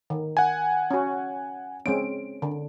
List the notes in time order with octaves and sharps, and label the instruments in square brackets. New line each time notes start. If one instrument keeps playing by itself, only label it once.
[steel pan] D#3
[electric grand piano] F#5 G#5
[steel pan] C#4 F#4
[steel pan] G#3 C4 C#4 [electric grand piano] D7
[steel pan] D3